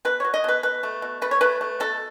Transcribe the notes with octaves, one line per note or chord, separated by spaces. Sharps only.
B2 B4
F#3 C#5
D#5
B2 B4
B2 B4
A3
B2
A3 B4
C#5
A3 B4
A3
B2 A4